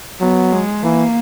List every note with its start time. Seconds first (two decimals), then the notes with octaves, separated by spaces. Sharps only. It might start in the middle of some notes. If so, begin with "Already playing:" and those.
0.20 F#3 B3
0.52 G#3
0.83 E3 A#3